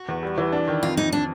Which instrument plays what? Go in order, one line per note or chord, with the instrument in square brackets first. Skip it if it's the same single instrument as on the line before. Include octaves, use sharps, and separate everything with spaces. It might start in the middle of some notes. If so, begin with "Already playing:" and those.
Already playing: [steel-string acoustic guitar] F#4
[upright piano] E2
G3
E3
D4
D#3
[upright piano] F2 [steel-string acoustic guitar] F4
[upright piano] F2 [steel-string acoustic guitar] D#4
[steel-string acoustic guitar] D4